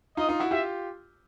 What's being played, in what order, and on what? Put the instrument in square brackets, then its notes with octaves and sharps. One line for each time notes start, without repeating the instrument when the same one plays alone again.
[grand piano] D#4 F4 [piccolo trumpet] D#5
[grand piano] D#4 F4
E4 F#4
[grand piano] F4 G4 [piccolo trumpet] E5